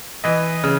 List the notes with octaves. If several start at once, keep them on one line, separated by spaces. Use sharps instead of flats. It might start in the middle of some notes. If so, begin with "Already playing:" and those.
E3 D#5
C#3